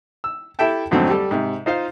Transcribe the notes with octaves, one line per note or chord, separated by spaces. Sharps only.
E6
E4 G4 A4 E5 G5 A5
F2 G#2 D3 F#3 A3 C4
G3 G4 A4
G#2 C3
D#4 F4 C5 D#5 F5